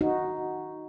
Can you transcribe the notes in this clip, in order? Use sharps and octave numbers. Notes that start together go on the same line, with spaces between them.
D#4 F#4